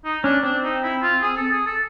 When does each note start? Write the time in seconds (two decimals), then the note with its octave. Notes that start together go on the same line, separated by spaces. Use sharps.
0.04 D#4
0.24 C#4 D4
0.43 C4 D4
0.63 D#4
0.83 E4
1.02 F4
1.22 G#4
1.37 A4
1.51 G#4
1.66 A4